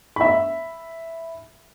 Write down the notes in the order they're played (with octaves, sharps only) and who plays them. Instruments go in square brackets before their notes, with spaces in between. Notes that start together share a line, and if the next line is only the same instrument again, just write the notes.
[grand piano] E5 B5